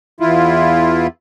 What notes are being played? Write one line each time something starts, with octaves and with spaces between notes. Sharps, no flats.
E2 E4 F4